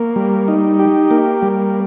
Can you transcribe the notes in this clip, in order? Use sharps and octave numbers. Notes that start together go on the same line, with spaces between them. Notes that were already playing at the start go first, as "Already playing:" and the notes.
Already playing: A#3
G3
D#4
G4
A#3
G3